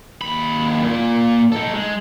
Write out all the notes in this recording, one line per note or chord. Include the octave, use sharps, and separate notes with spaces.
D#2 B5
A#2 A#3
D#4 A4
G#3